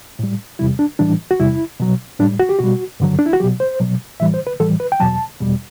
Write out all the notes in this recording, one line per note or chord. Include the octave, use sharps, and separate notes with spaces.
A2 G3
E2 C3 G3 E4
D4
A2 E3 G3 D4
F#4
E2 C3 G3 E4
B2 F#3
A2 G3 D4
F#4
G4
B2 G3 F#4
G2 D3 F#3
D4
E4
F#4
B2 F#3 G4
C5
B2 F#3
A2 E3 G3 E5
C5
B4
A2 E3 G3 A4
B4
G5
E2 B2 F#3 A5
E2 B2 G3